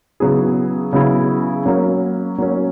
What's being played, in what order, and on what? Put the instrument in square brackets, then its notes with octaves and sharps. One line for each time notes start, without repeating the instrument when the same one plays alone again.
[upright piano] C#3 F#3 B3 E4 G#4
C#3 F#3 B3 E4 G#4
F#3 A#3 C#4
F#3 A#3 C#4